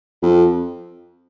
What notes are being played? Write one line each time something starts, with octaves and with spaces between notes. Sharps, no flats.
F2